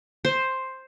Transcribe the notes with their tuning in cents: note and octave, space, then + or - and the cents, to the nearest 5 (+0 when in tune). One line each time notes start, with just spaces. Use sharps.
C5 +5